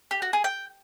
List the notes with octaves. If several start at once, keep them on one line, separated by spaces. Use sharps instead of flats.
G4
F#4
G#4
G5